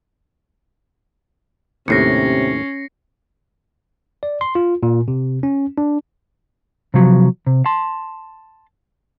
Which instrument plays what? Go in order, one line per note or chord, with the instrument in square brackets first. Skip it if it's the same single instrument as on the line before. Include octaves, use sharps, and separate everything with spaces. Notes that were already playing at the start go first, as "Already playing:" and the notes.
[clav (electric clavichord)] D#2 A2 [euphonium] C3 [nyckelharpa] C#4 [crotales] A#6 C7 C#7
[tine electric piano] D5
C6
F4
A#2
C3
C#4
D4
[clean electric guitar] C3 F3 F#3
C3
A5 C6